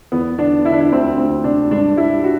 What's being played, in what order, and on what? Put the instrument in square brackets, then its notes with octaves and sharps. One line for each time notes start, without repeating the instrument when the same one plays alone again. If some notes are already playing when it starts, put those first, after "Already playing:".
[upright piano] E2 B3
D3 D4
D3 E4
D4
E4
D2 C4
D2 C4
C3 D4
G2 D4
G3 E4
F#4